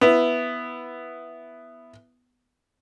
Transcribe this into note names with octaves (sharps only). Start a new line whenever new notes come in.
B3 E4